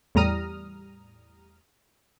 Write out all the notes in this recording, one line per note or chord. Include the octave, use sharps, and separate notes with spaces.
E2 A2 G3 A#5 D#6 F6